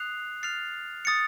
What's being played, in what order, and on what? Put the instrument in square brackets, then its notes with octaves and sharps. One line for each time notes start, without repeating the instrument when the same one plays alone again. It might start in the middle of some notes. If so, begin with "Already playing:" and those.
Already playing: [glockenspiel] D#6 F#6 C7 F7
F6 A6 C7 F7
D#6 A6 C#7